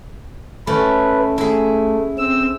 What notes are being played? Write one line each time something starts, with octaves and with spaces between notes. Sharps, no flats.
A3 C#4 E4 B4
A3 E4 G#4
C4 E6